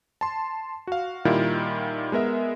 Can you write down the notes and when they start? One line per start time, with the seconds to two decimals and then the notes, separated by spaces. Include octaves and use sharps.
0.21 A5 C6
0.87 F#4 F5
1.25 A#2 D#3 G3 E4 F4
2.12 G#3 B3 A#4 E5